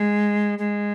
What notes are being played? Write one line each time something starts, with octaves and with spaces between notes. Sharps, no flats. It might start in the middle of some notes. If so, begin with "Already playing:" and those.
Already playing: G#3
G#3